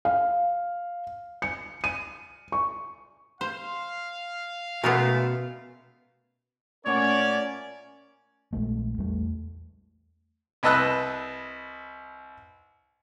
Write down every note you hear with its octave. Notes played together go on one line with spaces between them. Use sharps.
F5
C#7
D#7
C#6
C5 F5
B2 G#3 A3 B3 C#4 A#4
A#2 A3 C#4 A#4 C#5 D5 F#5
A#1 G#3 A3
E2 G3 A3
C2 B4 D#5 A5 E6 F#6